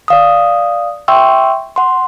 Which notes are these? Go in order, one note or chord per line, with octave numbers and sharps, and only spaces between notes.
D5 F5 D#6
E5 G5 C6 C#6 E6
F#5 C6